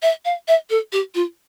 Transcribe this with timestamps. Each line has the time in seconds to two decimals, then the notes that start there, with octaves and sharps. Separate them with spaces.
0.03 E5
0.25 F5
0.48 E5
0.70 A4
0.92 G4
1.15 F4